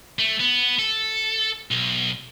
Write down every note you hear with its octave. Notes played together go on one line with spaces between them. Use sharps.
A3
B3
A4
B1